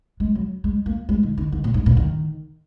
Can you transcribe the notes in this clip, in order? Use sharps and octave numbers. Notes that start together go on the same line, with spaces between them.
G#3
F#3
G#3
A#3
G#3
D#3
D#3
D#3
A#2
G#2
A#2
D#3